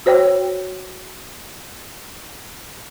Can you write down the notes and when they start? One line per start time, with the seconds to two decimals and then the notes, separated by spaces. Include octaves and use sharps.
0.06 F#4 C5 C#5 G5